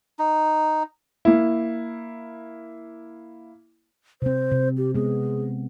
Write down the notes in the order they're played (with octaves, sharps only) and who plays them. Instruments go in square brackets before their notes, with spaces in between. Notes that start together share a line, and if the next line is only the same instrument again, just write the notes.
[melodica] D#4
[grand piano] A#3 E4
[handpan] C3 C4 [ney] C5
[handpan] C3
[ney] G4
[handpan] G#3 B3 [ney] G#4